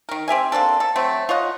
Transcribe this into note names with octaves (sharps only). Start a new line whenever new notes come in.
D#3 A#4
C4 G4 E5 G#5
A#3 C4 D4 A4
A4
F#3 A3 C4
F4 C#5 D#5 F#5